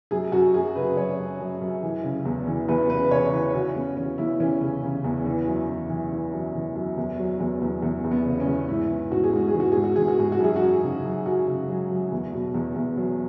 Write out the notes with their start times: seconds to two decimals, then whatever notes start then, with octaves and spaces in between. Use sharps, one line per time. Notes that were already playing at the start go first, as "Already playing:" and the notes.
0.11 F#2 G#4
0.32 F#2 F#4
0.54 F#2 G#4
0.76 C#3 B4
0.97 F#2 C#5
1.18 F#2
1.40 F#2
1.61 F#2
1.83 E3
2.04 C#3
2.25 E2
2.47 E3
2.68 E2 B4
2.90 C#3 B4
3.11 C#3 C#5
3.32 E3 B4
3.54 E3 F#4
3.76 E2 C#4
3.97 E3 C#4
4.18 E2 E4
4.40 E3 C#4
4.61 C#3
4.83 C#3
5.04 E2
5.25 E3
5.47 F#2
5.69 E3
5.90 E3
6.12 E3
6.33 F#2
6.55 E3
6.75 F#2
6.97 E2
7.19 F#3
7.40 E2
7.62 E2
7.82 E2
8.04 E2
8.11 B3
8.26 C#3
8.40 C#4
8.47 E2
8.69 G#2 E4
8.90 E3
9.12 G#2 F#4
9.24 G#4
9.33 G#2 F#4
9.48 G#4
9.54 E3
9.60 F#4
9.72 G#2 G#4
9.84 F#4
9.96 E3 G#4
10.08 F#4
10.19 G#2 G#4
10.32 F#4
10.40 F#2 G#4
10.56 F#4
10.62 F#2
10.83 C#3
11.05 F#2
11.26 F#2 F#4
11.47 C#3
11.69 F#3
11.90 F#2
12.12 E2
12.33 B2
12.54 E2
12.76 E2
12.97 F#3